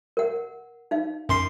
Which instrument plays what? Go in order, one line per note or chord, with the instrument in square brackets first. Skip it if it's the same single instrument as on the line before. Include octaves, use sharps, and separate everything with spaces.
[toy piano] A#4 F#5
D#4 F5
[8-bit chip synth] F#2 C6 C7